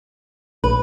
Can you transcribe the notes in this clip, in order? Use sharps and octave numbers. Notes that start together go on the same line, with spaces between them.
A#1 B4